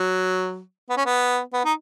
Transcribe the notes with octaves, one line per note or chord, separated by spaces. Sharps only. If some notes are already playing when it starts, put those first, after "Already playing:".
Already playing: F#3
B3
C#4
B3
B3
D#4